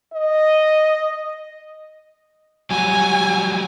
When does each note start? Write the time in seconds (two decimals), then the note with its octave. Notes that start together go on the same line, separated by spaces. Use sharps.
0.13 D#5
2.71 F#3 G3 F#4 G#5